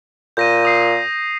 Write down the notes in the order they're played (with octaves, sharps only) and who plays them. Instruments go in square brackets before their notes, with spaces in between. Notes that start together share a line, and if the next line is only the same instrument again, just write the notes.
[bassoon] A#2 [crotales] G6 A#6 D#7
[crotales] D#6 C7